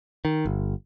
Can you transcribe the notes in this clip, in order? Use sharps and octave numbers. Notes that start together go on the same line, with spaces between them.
D#3
G1